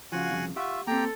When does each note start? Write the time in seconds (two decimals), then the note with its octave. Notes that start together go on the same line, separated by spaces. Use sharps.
0.12 C#3 F3 F#4 F5 F#5 G#5
0.31 C2 F2 C#3
0.56 F4 G4 E5 F#5 C#6
0.87 A#3 C4 G4 A4 G5 A#5